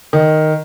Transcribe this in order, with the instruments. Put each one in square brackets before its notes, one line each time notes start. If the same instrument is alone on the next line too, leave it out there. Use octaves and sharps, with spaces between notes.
[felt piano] D#3